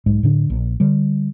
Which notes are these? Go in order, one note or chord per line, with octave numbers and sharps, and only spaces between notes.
B1 G#2 G#3
A2 D3 D4
A#1
D3 G3